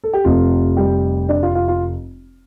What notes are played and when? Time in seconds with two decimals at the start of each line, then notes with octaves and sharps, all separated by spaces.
0.04 A4
0.13 G4
0.24 F1 F2 C3 A3 F4
0.77 G3 G4
1.29 D4 D5
1.43 F4 F5
1.55 F4 F5
1.68 F4 F5